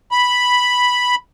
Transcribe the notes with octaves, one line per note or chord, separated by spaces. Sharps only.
B5